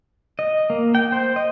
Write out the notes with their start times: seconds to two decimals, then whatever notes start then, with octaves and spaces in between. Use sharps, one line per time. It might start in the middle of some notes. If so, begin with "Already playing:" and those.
0.39 D#5
0.70 A#3
0.95 G5
1.12 C5
1.36 D#5